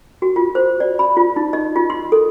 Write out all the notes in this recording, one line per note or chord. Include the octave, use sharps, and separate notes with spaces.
F#4
F4
C5
D5
B5
F4
D#4
D#5
F4
C6
A4